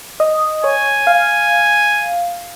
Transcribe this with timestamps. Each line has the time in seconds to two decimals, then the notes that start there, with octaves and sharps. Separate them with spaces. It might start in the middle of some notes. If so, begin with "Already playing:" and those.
0.20 D#5
0.64 C#5 G#5
1.07 F5